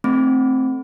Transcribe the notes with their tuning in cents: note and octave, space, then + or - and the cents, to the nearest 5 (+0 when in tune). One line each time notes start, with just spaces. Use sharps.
A3 +0 C4 +0